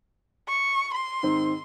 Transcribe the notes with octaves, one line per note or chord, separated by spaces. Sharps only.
C#6
C6
G#2 D#3 C4